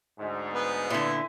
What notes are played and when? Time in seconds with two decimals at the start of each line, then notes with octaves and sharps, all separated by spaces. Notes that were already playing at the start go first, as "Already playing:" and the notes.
0.18 D2 G#2
0.54 B3
0.90 A#2 D3 E4